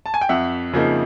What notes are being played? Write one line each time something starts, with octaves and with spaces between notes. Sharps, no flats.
A5
G#5
G5
F2 E5 F#5
C#3 F3 A#3 D#4